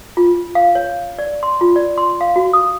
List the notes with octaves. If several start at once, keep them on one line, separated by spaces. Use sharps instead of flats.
F4
F5
C#5
D5
C6
F4
D5
C6
F5
F#4
D#6